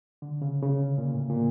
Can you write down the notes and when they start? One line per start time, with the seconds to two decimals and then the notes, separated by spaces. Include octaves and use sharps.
0.22 D3
0.42 C#3
0.62 C#3
0.98 A#2
1.14 A2
1.29 A#2